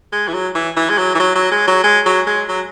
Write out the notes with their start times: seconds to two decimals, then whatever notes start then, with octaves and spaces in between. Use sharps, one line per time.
0.12 G#3
0.28 E3
0.34 F#3
0.55 E3
0.77 E3
0.89 G#3
0.98 F#3
1.15 E3
1.20 F#3
1.36 F#3
1.52 G#3
1.68 F#3
1.84 G#3
2.06 F#3
2.27 G#3
2.49 F#3